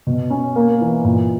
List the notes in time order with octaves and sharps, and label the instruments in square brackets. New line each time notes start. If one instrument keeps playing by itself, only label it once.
[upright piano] B2
C#4
A#3
E3
A#2